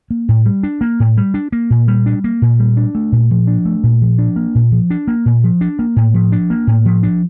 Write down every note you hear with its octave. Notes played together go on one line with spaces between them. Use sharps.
A#3
A2
G3
D4
A#3
A2
G3
D4
A#3
A#2
G3
D4
A#3
A#2
G3
D4
A3
A#2
F3
D4
A3
A#2
F3
D4
A#3
A#2
F3
D4
A#3
A#2
F3
D4
A#3
A2
F3
D4
A#3
A2
F3
D4